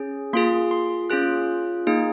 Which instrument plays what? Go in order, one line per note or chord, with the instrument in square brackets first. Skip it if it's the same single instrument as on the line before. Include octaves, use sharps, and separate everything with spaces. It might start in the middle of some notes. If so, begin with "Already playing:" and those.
Already playing: [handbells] C#4 G#4
A#3 F4 G#4 C6
C6
C#4 F4 G#4 F#6
A#3 D#4 G#4